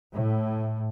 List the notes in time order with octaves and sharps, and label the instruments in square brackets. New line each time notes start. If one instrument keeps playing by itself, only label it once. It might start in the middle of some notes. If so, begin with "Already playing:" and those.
[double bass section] A2